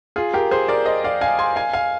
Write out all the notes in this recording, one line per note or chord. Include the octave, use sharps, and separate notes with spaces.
F4 G#4
G4 A#4
G#4 C5
A#4 D5
C5 D#5
D5 F5
F5 G#5
G#5 C6
F5 G#5
F5 G#5